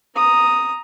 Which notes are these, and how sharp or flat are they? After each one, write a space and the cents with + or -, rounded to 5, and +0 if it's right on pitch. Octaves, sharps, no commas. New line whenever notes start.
A#5 +0 D#6 +0